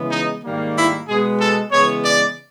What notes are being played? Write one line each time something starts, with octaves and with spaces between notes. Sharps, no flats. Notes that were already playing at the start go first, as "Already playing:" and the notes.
Already playing: C#3 E3 G#3 B3
D#4
G#2 D#3 G3 A#3
E4
B2 G#3 B3 G#4
A4
C#3 E3 G#3 B3 C#5
D5